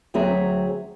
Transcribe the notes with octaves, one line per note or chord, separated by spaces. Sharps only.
D2 F#3 C4 G#4 E5 A#5